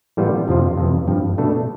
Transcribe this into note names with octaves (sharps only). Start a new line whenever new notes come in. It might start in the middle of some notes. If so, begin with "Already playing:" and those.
A2 E3 G3 B3 F4
F2 C3 F3 C4 F4
F2 C3 E3
G2 F3 C4
B2 A3 D4 A4